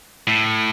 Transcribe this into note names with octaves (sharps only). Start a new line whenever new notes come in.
A2